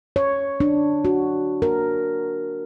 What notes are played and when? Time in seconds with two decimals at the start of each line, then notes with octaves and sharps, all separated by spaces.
0.16 C#5
0.60 D4
1.05 F#4
1.62 A#4